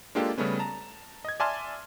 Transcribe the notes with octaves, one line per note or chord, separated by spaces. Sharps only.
G#3 A#3 D4 F4 G4 A4
C#3 G3 A3 B3 C#4
A5 A#5
D#5 G#6
D5 E5 G#5 A5 C6 F6